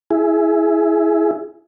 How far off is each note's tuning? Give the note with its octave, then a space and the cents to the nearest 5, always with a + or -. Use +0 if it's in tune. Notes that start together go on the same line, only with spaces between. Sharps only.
E4 +0 G#4 +10